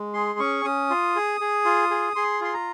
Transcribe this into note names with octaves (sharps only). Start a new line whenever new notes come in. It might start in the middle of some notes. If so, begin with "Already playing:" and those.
Already playing: G#3
G#4 C6
C#4 C#6
C#4 D#6
F4
G#4
G#4
F4
G#4
G#4 C6
F4 C6
A#5